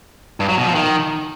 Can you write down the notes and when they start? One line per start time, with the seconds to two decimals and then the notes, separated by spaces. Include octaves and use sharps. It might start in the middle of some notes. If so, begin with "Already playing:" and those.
0.40 G2
0.49 F#3
0.58 B2
0.66 F3
0.75 D#3